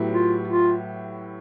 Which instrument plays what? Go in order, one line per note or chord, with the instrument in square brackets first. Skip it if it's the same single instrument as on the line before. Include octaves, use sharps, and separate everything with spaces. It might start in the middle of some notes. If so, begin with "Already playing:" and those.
Already playing: [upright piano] A2 F#3 B3 E4 G4
[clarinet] F4
F4